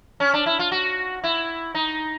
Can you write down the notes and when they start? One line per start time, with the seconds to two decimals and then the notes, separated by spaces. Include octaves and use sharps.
0.20 C#4
0.34 D4
0.46 E4
0.59 F4
0.72 F#4
1.24 E4
1.75 D#4